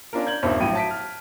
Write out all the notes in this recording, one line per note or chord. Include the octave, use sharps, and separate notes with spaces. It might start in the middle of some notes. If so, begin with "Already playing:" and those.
C#4 D4 F4 A#4
G6 G#6 F#7
D#1 G2 C4 E5
A#1 A2 F#3 G5 D#7
A5 B6 D7
F6